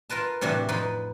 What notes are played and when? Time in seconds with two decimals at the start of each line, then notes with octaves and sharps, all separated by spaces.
0.10 F4 A#4 B4 A5
0.41 A2 C3 E3 G3 D4 F#4
0.68 F2 F3 D#4 B4 B5